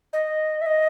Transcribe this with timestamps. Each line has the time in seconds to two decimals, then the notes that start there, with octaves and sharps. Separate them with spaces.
0.13 D#5
0.61 E5
0.66 D#5